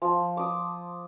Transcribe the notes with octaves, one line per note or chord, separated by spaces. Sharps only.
F3
D6 D#6